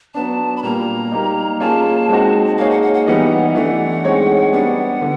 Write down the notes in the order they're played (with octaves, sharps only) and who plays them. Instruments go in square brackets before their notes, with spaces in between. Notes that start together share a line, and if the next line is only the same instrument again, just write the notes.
[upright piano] F#3 B3 D4 [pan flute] A5
[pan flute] B5
[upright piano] A#2 G3 A#3 [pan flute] A#5
[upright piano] G3 A#3 D#4
[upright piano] A#3 C#4 F4 G#4 C#5 [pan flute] A5
[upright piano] G#3 C4 D#4 F#4
[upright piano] A#3 D#4 G#4 C#5 [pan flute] F5
[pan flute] F#5
F#5
F#5
[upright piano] E3 G3 B3 D#4 [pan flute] F#5
[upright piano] E3 A3 D4 [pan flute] F#5
[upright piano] G#3 C4 D#4 G#4 C#5
[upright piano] G3 B3 D4 [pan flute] F#5
[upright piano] D3